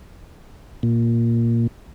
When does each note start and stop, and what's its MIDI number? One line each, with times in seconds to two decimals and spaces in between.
0.83 1.67 46